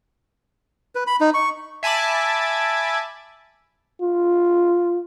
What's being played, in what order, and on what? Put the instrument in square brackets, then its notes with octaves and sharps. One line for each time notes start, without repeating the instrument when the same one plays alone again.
[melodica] B4
B5
D#4
C#6
[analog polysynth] E5 G#5 A5 B5 D6
[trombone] F4